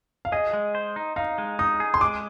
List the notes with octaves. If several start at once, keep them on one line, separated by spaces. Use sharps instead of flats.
F5
G#4 D#5
G#3
C5
D#4
D#4 F5
G#3
D#4 D#6
G#4
C6
G#3 D6